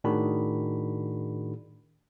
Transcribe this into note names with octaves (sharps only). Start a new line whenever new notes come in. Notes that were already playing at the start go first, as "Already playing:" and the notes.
A2 D#3 D4 F#4 G#4 B5